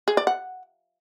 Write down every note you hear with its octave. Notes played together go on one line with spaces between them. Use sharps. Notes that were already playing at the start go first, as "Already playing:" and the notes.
G#4
D5
F#5